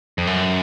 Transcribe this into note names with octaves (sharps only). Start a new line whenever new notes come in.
F2
F#2